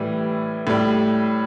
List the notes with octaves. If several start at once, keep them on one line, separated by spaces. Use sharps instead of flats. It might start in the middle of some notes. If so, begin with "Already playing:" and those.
Already playing: A2 E3 G3
A2 G3